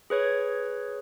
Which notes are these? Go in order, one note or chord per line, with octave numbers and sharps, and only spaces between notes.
G#4 B4 C#5 G#6